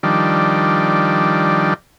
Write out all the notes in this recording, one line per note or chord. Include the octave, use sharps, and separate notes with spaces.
D#3 F3 G3 D4